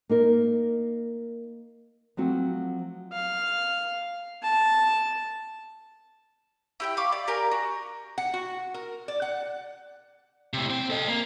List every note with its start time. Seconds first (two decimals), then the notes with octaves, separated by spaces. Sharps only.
0.09 A#3 D#4 A#4
2.17 F3 F#3 A3 C4 F#4
3.13 F5
4.43 A5
6.80 E4 G4 G5
6.97 F5 B5 C#6 D6
7.12 D5
7.28 G4 A#4 D5 G#5
7.51 F#4
8.18 F#5
8.34 F#4
8.74 A#4
9.08 D5
9.22 F#5
10.53 A2 C3
10.70 C4
10.90 A4 D#5
11.08 A#3